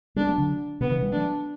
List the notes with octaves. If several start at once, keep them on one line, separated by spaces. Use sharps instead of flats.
G3 B3 D4
F#3 A3
D3 F#3
B2 D3 B3
C3 E3
E3 G3
F#3 A3 D4